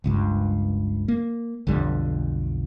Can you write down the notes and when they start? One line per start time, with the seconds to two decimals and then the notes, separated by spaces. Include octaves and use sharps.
0.04 F#1 C#2 G2
1.08 A#3
1.67 B1 F2 D3 G3